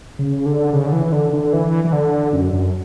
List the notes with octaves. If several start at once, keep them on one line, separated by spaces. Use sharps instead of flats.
C#3
D3
C#3
D3
E3
D3
D3
E3
E3
D3
F#2
F#2